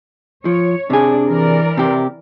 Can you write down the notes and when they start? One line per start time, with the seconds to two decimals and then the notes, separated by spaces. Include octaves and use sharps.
0.45 F3 C#5
0.90 C3 D4 G#4
1.27 E3 A#4 D5
1.77 C3 G4